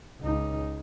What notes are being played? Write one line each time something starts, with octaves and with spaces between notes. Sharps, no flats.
C#2 D#4